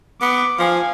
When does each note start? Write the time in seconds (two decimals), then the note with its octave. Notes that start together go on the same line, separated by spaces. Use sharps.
0.21 B3 D6
0.59 F3 F5 G#5